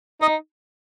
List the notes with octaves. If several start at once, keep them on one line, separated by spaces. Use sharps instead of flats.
D#4 D#5